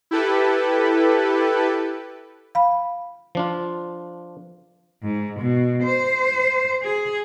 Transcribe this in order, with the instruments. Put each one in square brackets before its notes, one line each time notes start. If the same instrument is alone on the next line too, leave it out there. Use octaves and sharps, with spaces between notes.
[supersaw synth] E4 G4 A4 B4
[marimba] F5 B5
[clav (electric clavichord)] F3 D4 F4
[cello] G#2
B2
C5
G#4